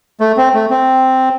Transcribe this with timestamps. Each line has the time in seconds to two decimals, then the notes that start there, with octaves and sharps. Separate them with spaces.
0.20 A3
0.37 C4
0.54 A3
0.70 C4